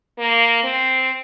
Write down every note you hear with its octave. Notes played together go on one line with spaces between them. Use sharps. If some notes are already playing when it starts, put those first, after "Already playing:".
A#3
C4